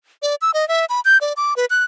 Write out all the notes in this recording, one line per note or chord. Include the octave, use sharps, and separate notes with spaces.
D5
E6
D#5
E5
B5
G6
D5
D6
B4
F#6